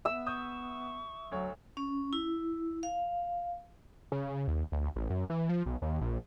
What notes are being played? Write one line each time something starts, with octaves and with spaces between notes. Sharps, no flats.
B3 E5 E6
C#6 D#6 G6
D2 F#3 C#5
C#4
E4
F5
C#3
D#2
D2
A1
F#2
E3
F3
B1
D#2
A#1